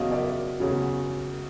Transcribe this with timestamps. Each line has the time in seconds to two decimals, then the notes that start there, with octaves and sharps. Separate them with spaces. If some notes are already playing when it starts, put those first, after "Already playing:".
Already playing: E2 C#3 F#3 D#5 F5
0.11 D5 E5
0.60 E2 C#3 F#3